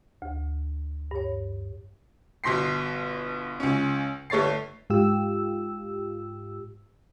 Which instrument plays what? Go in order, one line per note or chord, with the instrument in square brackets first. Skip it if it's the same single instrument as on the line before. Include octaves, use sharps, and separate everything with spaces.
[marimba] D2
G2 C#5
[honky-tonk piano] G1 B2 C6 B6 C7
C#2 C#4
G1 A3 C#5 A6 C7
[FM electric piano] G#2 F4 G4 E6